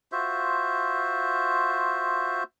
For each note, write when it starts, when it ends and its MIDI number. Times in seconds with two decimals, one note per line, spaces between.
0.12 2.43 65
0.12 2.43 66
0.12 2.43 72
0.12 2.43 76